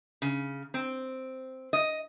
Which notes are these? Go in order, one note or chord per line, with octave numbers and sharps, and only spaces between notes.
C#3
C4
D#5